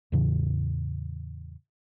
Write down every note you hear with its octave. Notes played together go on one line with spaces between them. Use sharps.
E2 A2 C#3 E3